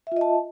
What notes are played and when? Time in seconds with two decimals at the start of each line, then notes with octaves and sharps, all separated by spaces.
0.07 E5
0.12 F4
0.16 D#5
0.21 A5